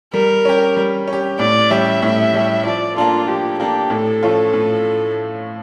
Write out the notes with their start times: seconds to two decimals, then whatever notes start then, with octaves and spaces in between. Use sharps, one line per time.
0.13 G3 A#4
0.45 C#4 G4
0.77 G3
1.08 C#4
1.13 G4
1.39 A2 D5
1.70 G3 C#4 G4 E5
2.02 A2
2.33 G3 C#4 G4
2.65 F3 D5
2.96 A#3 D4 F4 A4
3.28 F3 G4
3.59 A#3 D4 G4 A4
3.90 A2 A4
4.23 F3 A3 C#4 F4
4.53 A2